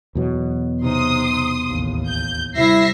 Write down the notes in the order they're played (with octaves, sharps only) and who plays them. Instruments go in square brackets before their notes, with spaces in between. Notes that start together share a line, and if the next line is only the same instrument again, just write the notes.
[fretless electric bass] E2 B2 F#3
[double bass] C3 D#4 [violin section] C6 D#6
[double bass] A1 D#2
[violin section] G6
[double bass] C3 G3 [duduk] E4 [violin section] E5 A#6 C7